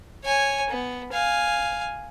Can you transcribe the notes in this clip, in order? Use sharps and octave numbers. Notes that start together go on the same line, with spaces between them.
C#5 G#5
B3
F5 G#5